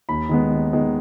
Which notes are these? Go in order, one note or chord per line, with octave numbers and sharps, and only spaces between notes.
D#2 B5
D#3 G#3 B3
D#2
D#3 G#3 B3